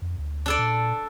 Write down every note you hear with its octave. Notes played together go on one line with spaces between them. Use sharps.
F2
D2
D4 A4 D5
A#2